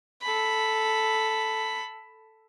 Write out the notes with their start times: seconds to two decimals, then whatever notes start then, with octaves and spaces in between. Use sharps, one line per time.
0.22 A4 B5